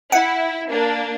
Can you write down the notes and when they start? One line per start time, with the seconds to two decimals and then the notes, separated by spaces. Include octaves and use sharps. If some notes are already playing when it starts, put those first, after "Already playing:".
0.12 E4 F#5
0.71 A#3 D4